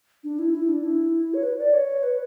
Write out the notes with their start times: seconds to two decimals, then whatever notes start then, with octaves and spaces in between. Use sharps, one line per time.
0.24 D4
0.39 E4
0.54 E4
0.69 D4
0.84 E4
1.34 C#5
1.43 B4
1.59 D5
1.73 C#5
2.03 B4